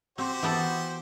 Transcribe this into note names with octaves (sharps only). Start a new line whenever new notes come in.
C4 F#4 G4 C5
E3 B3 A4